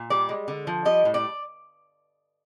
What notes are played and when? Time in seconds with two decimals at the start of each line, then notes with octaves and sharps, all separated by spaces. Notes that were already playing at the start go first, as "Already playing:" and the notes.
Already playing: A#2
0.10 G3 D5
0.29 G#3
0.48 D3
0.67 F3
0.85 G3 D#5
1.05 A2
1.14 D5